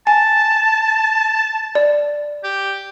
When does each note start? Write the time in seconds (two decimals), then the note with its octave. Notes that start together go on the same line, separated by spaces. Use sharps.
0.07 G#5 A5
1.75 D5
2.44 G4